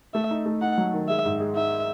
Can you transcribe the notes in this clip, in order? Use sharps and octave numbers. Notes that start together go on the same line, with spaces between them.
A3 E5
D#4
A3
D#4 F#5
F#3
D#3
G#3 E5
G#2
G#3
D#4 E5